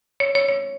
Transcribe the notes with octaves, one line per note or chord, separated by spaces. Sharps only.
C#5
C#5
C#5